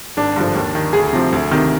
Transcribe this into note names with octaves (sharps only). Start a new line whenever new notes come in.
G#1 D4
G2 D3 F3
D#2
D#3
D2 G#4
C3 F3
D2
C3 D#3